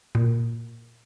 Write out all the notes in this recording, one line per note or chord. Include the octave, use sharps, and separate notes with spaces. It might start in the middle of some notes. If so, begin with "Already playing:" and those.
A#2